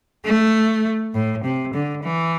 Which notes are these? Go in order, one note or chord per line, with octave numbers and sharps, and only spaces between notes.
A3
A2
C3
D3
E3